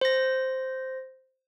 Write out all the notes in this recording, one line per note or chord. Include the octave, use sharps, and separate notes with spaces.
C5 A#6